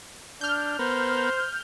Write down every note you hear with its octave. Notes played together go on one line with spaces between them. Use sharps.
D4 F6 G6
B3 A#4 C5